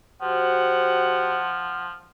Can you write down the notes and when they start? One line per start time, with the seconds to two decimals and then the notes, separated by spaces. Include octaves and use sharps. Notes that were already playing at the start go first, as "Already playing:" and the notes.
0.22 F3 F#4 G4 C5 F#5